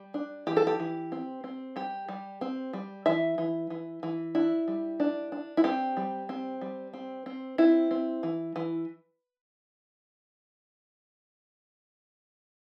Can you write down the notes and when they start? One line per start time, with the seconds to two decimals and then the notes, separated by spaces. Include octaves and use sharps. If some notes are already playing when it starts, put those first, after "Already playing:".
Already playing: G3
0.14 D4
0.47 E3 G4
0.57 A4
0.67 G4
0.80 E3
1.12 C4
1.44 C4
1.76 G3 G4
2.09 G3
2.41 C4
2.73 G3
3.06 E3 E5
3.38 E3
3.70 E3
4.03 E3
4.35 D4 E4
4.68 G3
5.00 D4
5.32 D4
5.57 E4
5.64 C4 G4
5.97 G3
6.29 C4
6.61 G3
6.93 C4
7.26 C4
7.58 C4 E4
7.91 C4
8.23 E3
8.56 E3